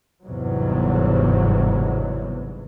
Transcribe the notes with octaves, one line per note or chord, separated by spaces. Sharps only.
G1 E2 G#2 C3 F#3